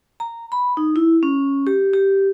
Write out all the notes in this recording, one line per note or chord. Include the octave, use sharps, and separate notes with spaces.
A#5
B5
D#4
E4
C#4
G4
G4